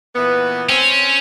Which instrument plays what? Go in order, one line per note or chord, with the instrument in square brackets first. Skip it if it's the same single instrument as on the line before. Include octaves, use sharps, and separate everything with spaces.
[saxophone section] A#2 E3 B3
[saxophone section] C4 [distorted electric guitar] C#4